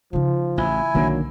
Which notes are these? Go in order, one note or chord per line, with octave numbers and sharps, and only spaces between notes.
C#3 F3 D#4
A1 E4 G#5
B1 D3 D#3 F#3 A#3 D4